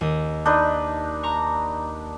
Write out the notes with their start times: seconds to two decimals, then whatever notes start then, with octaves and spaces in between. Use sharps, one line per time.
0.01 D#2 D#5
0.46 D4 D#4 B4
1.23 A#5 C#6